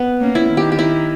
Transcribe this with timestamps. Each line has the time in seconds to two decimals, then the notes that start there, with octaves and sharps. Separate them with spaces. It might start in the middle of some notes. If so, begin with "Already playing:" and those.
Already playing: B3
0.21 A#3 C#4
0.35 E4
0.50 D#3
0.57 G4
0.72 G4
0.79 E4